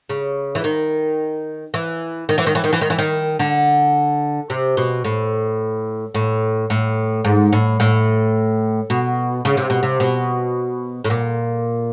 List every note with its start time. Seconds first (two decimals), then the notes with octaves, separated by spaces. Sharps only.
0.09 C#3
0.55 E3
0.64 D#3
1.74 E3
2.29 D#3
2.38 E3
2.47 D#3
2.55 E3
2.64 D#3
2.73 E3
2.81 D#3
2.90 E3
2.98 D#3
3.39 D3
4.50 C3
4.77 B2
5.05 A2
6.15 A2
6.70 A2
7.25 G#2
7.53 A2
7.80 A2
8.90 B2
9.45 C#3
9.57 C3
9.70 B2
9.83 C3
10.00 B2
11.05 A2
11.10 A#2